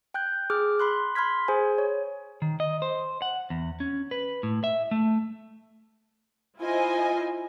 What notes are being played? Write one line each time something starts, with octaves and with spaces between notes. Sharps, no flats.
G5 F#6 G6
G#4 D6 F6
B5 C6 F#6
B5 C6 F6 G#6 B6
G#4 C5 G#5
C#5
D#3
D#5
C5
F#5
E2
C#4
B4
A2
E5
A3
E4 F4 C5 D#5 G#5